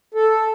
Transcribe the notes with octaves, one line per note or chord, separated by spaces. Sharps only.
A4